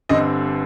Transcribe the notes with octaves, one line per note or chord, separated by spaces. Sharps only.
G1 G2 D3 G3 C4 D#5